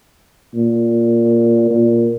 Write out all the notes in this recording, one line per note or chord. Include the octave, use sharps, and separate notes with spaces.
A#2
A#2